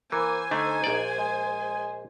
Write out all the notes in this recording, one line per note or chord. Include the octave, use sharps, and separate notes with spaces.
E3 A#3 C5 G#5
D3 A3 D#4
A#1 D5
G#3